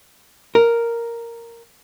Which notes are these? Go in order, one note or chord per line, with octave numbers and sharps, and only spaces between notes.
A#4